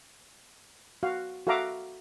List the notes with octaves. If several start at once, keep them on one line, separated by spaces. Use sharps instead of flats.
F#4 F5
F#4 A4 E5 F5 A#5 D6